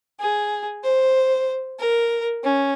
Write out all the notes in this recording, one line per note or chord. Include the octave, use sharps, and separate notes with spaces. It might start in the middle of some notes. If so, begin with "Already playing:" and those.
G#4
C5
A#4
C#4